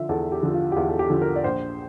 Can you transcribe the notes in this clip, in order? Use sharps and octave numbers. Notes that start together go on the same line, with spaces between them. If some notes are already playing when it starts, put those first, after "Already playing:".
Already playing: D3 F3 E5
E2 A4
G4
D3 F3
F4
G4
E2 F4
A4
G4
D3 F3
A#4
D5
A#1 C5